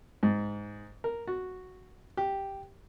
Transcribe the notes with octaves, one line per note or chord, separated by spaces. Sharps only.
G#2
A#4
F#4
G4